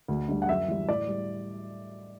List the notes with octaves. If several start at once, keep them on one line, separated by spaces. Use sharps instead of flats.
D2
D3 G3
F#5
F#2 E5
E3 G3
A2 D5
G3